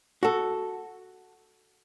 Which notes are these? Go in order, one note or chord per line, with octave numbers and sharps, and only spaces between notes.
F#4 A4